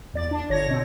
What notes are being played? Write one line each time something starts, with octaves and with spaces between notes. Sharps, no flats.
E2 D5 A6
D4
G1 C#5 A#6
B2 C4